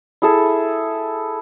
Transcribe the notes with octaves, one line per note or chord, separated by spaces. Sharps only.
E4 G#4 A4